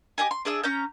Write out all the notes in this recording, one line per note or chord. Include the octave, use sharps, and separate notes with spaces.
G4 G#4 D#5 G#5
C6
D4 G#4 E5 D#6
C#4 A#5 G6